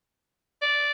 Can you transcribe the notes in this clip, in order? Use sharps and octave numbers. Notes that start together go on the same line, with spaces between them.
D5